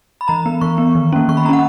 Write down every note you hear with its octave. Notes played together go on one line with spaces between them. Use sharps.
B5
E3 A#5
B3
E3 C#6
B3
D#3
A#3 C#4
D#3 C#6
B5
A#3 C#4 F#5 A#5